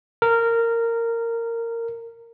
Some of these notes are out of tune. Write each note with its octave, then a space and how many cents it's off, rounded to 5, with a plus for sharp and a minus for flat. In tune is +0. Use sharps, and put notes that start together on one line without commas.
A#4 -15